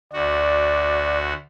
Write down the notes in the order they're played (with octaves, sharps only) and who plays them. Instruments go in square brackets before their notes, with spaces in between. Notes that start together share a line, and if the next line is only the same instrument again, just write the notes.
[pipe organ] D2 F#4 [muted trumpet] D5